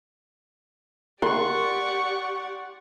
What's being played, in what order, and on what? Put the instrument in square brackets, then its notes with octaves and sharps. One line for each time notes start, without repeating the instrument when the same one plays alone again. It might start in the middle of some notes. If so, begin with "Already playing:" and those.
[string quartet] G4 D5 F#5 [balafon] A#4 [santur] C6 [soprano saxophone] C#6